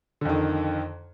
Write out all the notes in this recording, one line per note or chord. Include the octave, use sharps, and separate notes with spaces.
F2 D3 D#3